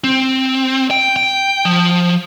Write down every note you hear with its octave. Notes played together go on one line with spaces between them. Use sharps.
C4
G5
G5
F3